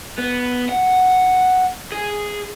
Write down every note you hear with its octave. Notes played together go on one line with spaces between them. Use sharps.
B3
F#5
G#4